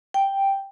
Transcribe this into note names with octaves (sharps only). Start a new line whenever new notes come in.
G5